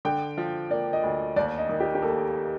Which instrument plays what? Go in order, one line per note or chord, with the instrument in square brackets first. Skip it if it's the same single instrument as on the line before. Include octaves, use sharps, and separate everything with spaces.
[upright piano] D3 [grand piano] G5
[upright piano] F3
[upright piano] A#3 [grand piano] D5
[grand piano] D#5
[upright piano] D2
[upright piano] D#2 [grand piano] D5
[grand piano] D#5
[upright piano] D#3
[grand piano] G4
G4
[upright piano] A#3 [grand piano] A4